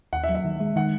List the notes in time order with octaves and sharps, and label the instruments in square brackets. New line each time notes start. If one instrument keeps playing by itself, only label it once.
[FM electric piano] D#2 [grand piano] F#5
[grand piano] E5
[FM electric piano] F#3
[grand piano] E5
[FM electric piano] D#3
G#3
[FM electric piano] D#3 [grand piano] F#5